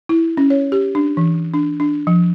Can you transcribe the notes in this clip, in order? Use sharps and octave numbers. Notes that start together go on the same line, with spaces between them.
E4
C#4
C#5
G4
D4
E3
D4
D4
F3